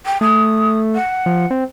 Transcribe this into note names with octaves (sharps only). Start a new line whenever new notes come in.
G5
A3 D#6
F#5
F3
C4